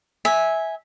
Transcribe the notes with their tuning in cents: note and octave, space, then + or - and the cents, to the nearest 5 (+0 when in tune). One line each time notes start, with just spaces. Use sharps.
E5 -15 G#5 +0